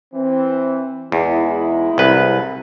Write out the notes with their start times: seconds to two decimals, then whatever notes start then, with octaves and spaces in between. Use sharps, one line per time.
0.14 E3 C4
1.12 E2 G#3 D#4 E4
1.98 C2 B4